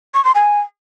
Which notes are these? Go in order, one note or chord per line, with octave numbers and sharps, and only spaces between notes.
C#6
C6
G#5